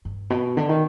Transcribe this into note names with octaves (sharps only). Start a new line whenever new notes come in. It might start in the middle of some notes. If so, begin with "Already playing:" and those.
G2
B2
D3
D#3